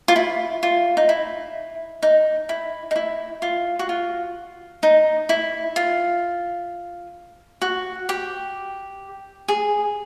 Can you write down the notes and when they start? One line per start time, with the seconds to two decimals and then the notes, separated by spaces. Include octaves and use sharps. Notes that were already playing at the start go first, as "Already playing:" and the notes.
0.08 F4
0.16 E4
0.63 F4
0.97 D#4
1.09 E4
2.03 D#4
2.49 E4
2.91 D#4
2.96 E4
3.42 F4
3.79 F#4
3.89 F4
4.83 D#4
5.29 E4
5.76 F4
7.62 F#4
8.09 G4
9.48 G#4